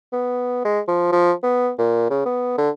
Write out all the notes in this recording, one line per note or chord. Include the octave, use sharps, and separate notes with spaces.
B3
G#3
F3
F3
B3
A#2
C#3
B3
D3